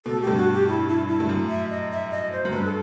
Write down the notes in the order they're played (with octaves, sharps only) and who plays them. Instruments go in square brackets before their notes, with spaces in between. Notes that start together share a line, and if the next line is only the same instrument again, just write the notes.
[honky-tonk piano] B2 [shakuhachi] A4
[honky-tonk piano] A2 [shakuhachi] G4
[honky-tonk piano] G2 B2
[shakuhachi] F#4
G4
E4
E4
E4
[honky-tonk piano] G2
F#2 A2
[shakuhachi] E5
D#5
E5
D#5
C5
[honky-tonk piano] F#2
[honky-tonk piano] G2 [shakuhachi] B4
[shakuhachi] A4